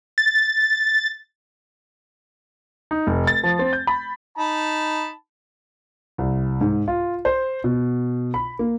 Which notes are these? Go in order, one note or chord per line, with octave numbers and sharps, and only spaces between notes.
A6
D#4
F1
A6
F3
C4
G6
B5
D#4 A5 B5
C2
G#2
F4
C5
B2
B5
A#3